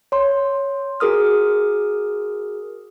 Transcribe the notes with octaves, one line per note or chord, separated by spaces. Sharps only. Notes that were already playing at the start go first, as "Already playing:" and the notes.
C#5 C6
F#4 G#4 A#4 D#6 F6